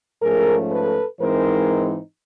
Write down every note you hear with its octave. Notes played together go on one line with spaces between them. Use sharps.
G#2 F3 A3 C#4 G#4 A#4
A4 B4
G#2 E3 G#3 C4 D#4 A#4 C5